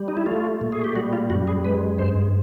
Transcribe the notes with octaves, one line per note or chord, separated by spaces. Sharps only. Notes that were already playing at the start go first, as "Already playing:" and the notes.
Already playing: G3
D#4
E4
A3 F4
A#2
G#4
G4
G3 F#4
F4
F#2 F#4
G#4
G#3 B4
G2 C5